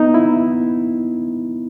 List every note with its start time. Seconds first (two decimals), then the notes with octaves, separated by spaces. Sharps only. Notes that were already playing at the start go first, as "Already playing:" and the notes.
Already playing: B3 D#4
0.14 E4